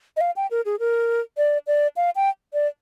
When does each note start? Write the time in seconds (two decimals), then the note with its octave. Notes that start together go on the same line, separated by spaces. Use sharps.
0.17 D#5
0.21 F5
0.36 G5
0.51 A#4
0.66 G#4
0.80 A#4
1.38 D5
1.67 D5
1.97 F5
2.16 G5
2.53 D5